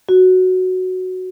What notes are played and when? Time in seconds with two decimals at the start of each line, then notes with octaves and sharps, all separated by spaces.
0.09 F#4